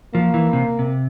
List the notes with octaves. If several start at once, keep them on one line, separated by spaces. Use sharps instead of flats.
F3 A#3
E3
C3
C3